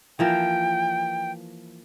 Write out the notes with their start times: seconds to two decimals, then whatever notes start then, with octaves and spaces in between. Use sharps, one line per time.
0.19 E3 F3 A#3 G5